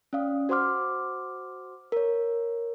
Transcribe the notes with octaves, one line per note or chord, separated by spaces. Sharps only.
C#4 D5 F5 D#6
F#4 C5 F#5 C6 D6 F6
A#4 C#5